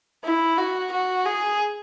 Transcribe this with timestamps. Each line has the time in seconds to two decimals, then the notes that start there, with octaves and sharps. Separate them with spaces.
0.24 E4
0.58 F#4
0.92 F#4
1.25 G#4